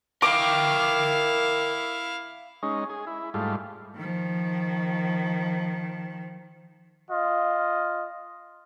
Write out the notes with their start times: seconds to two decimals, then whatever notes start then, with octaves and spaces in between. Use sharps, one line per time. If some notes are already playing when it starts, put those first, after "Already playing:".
0.22 E4 A#4 F5 G5 D6
2.63 G#3 C#4 D#4
2.89 G#4
3.07 E4
3.34 G#2 G3 A3 F4
3.96 D#3 F3
7.11 F4 D#5